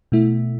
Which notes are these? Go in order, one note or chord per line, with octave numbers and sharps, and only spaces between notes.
B2 A3 E4